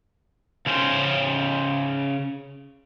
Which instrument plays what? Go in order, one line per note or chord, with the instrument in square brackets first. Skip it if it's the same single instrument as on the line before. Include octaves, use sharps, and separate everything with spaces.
[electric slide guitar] C#3 C#4 C5